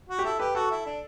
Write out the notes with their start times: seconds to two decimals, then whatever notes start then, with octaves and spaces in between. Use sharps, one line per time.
0.09 F#4
0.19 G4
0.24 E4 A4
0.40 G4 B4
0.55 F#4 A4
0.71 E4
0.86 D4